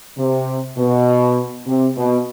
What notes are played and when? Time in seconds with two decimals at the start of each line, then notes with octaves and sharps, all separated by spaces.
0.18 C3
0.78 B2
1.67 C3
1.96 B2